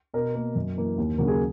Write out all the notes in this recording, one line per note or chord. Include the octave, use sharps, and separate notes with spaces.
B2 A#4
A#3
F#2
E3 A#3
D#2
C#3 F#3 A#3
G#4